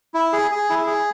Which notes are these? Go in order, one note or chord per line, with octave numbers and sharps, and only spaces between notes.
E4
G#4
G#4
E4
G#4